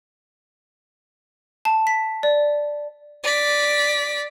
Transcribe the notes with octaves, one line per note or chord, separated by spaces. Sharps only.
A5
B6
D5
D5 B6